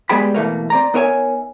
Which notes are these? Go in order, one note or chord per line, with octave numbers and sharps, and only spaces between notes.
G3 G#3 B3 G#4 G5 B5
B2 E3 A3 A#3
C4 D5 A#5
B3 D#4 A#4 C#5 E5 G#5